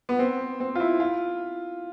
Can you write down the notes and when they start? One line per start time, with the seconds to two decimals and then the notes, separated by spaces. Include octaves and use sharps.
0.09 B3
0.19 C4
0.60 C4
0.75 F4
0.80 E4
1.00 F4